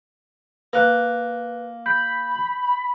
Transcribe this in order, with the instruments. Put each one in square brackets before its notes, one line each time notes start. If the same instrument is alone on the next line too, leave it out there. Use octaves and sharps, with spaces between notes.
[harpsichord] A#3 [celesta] B4 F#6
[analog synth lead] B5 [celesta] G6